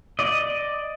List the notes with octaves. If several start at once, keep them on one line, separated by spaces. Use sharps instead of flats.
D5 D#5